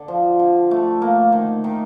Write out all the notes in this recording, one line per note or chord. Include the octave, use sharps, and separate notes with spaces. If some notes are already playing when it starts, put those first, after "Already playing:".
Already playing: D3
F3
D3
A3
A#3
D#3
D#3